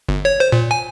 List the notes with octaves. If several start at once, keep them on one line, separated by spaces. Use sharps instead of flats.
G1
C#5
C5
A#2
G#5